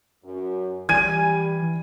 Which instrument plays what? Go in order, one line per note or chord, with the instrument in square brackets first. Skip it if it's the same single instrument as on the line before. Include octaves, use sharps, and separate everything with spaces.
[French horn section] F#2
[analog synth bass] E3 [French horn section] G3 [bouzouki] G#5 [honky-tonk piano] G#6 D#7